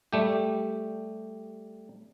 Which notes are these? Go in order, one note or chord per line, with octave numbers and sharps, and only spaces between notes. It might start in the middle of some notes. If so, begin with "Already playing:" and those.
G3 A3 G4